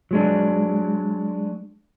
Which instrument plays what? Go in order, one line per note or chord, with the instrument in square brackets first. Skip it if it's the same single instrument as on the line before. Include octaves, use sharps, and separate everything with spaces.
[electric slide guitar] F#3 G#3 D4